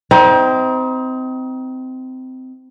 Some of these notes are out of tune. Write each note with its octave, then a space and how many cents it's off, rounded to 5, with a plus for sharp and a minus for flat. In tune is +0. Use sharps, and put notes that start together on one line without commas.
C4 -20 D#4 +30